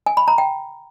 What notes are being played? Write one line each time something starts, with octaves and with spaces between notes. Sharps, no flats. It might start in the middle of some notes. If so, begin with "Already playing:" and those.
G#5
B5
A#5
G5